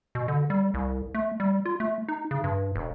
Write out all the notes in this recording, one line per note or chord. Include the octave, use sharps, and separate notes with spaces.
B2
D3
G3
C2
A3
G3
F4
A3
D#4
C#3
G2
E1